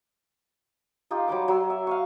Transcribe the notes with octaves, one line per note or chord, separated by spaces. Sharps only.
D#4 F4 G4
F#3 G3 G5 D6
F#3 C6 E6
E5
F5 G#5 C#6